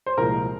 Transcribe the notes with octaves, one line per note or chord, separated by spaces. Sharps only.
C5
C2 A#2 F3 G#3 A#4